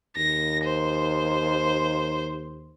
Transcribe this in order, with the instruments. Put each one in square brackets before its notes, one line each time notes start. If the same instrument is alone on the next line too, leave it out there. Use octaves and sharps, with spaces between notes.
[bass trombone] D#2 [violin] A#6
[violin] C5